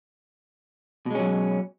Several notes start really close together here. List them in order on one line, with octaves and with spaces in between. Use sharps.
B2 G#3 C#4 F#3